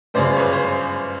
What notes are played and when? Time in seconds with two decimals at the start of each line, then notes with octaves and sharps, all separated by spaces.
0.14 G1 F#2 C#3 C5 D5
0.37 B4 C#5
0.53 C5